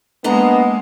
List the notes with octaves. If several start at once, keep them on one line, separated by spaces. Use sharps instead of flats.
G#3 A#3 B3 D4 D#5 A#5